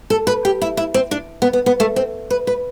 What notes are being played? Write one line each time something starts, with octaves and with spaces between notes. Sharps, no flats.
A4
B4
G4
E4
E4
C4
D4
B3
B3
B3
A3
C4
B4
B4